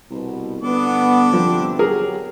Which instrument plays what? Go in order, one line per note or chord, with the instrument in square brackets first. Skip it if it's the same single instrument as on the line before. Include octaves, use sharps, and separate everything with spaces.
[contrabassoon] C2 [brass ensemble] B2
[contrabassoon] G1 [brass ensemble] B3 [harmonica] D4 A4 D6
[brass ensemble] C3 C4 [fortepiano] F3
[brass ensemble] F#3 G4 [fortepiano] G#4 A#4